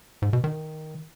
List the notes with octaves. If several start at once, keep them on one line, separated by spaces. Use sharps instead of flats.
G#2
B2
D#3